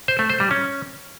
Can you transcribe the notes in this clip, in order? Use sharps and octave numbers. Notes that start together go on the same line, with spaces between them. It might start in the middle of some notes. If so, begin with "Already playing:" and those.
C5
A3
C5
G3
C#4